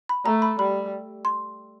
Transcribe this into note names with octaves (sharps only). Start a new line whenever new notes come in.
B5
A3 A#5
B5
G3 B5
C6